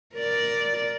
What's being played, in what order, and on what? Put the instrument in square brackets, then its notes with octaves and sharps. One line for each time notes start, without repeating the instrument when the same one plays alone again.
[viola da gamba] A#4 D5